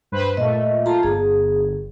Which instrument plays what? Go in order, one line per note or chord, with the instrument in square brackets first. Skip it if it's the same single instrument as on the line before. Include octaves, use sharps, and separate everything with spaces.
[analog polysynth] G2 B4 C5
[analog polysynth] A#2 A3 [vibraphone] D#5
[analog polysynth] F4 [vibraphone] A5 A#5
[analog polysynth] G1 [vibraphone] G#4